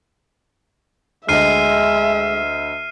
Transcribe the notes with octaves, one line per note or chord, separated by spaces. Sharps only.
D2 G#3 D#5 E5 F6 C7 D#7